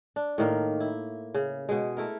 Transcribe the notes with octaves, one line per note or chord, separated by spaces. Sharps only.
D4
A2 D#3 A#3
E4
C#3
B2 G#3
A3 E4 A#4